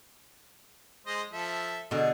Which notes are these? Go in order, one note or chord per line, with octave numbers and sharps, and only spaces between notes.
G#3 C5 D#5
F3 A4 E5
B2 D3 G#4